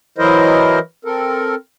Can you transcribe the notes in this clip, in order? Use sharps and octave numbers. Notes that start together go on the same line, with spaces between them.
E3 F#3 E4 A#4 C5 D#5
C4 A4 A#4